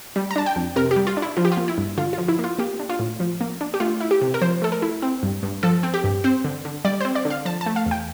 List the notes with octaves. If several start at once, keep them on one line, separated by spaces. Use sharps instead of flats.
G3
A#5
D4 A5
G5
F2
C3 A#4
G4
G3
F4
D4
E4
F3 F4
G4
F4
A#3
E4
G2
D3 F4
F3 F4
E4
A#3
F4
A#3 G4
D4
F4
A2
F3
A#3
D4
G4
A3 F4
E4
G4
C3
A#4
F3 C5
A3 A4
A#4
E4
C4
G2
G2
F3 A4
C4
G4
G2
C4 C5
D3
D3
G3 D5
C4 C5
D5
D3
F5
F3 A5
A5
A3
F5
E2
G5